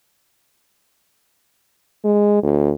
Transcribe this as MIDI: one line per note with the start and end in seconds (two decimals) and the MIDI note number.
2.04 2.42 56
2.43 2.72 38